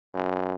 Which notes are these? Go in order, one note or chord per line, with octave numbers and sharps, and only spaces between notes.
F#2